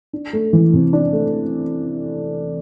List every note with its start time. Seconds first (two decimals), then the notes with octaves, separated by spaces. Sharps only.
0.13 D4
0.33 A3
0.53 E3
0.73 C3
0.93 D4
1.13 A3